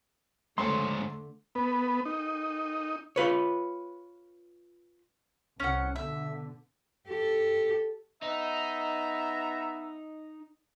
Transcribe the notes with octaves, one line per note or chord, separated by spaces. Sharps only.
D3 G#3 A3 C5 C#5 C6
B3
D#4
F4 B4 C#5
C2 C#4 F#5
B2 D3 E5
G4 A4
B3 D#4 E5 A#5